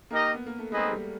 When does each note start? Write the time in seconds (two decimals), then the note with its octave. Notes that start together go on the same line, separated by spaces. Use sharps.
0.10 A#3 D#4 G4 A#4 D#5
0.34 B3
0.47 A#3
0.59 A3
0.71 G#3 C4 D#4 G#4 B4 D#5
0.92 G3